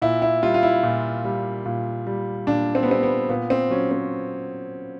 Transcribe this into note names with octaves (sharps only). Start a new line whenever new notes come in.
A#2 E4
E4
G3 F4
F4
E4
A#2
G3
A#2
G3
A#2 D4
C4
B3
G3 C4
B3
A#2 B3
C4
F#3 C#4
C4